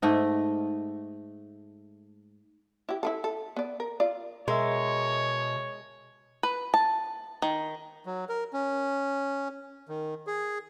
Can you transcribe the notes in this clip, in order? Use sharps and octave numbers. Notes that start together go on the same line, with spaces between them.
G#2 A3 D#5
E4 G4
E4 F4 A4
A4
B3 D5
A#4
F4 D5
B2 G#3 A#4 C#5 E5
B4
A5
D#3
F#3
A#4
C#4
D#3
G#4